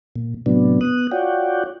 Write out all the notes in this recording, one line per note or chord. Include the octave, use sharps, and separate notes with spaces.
A#2
A2 C3 F#3 B3 D4
B3 D#6 F#6
F4 F#4 C#5 D5 F#5 G5